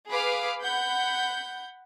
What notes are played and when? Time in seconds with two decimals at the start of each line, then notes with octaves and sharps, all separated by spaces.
0.10 G#4 B4 F5 B5 D6
0.62 F#5 B5 G6